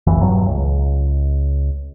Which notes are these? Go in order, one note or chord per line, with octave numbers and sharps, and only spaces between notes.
F1 B1 F2 E3
E1 G2 F#3
C#2